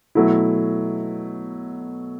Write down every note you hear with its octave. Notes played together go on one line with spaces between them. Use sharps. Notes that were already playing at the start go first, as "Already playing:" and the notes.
B2 F#3 A3 E4